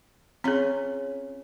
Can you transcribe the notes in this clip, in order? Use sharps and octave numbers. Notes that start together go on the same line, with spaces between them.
C4 C#4 F4 G#4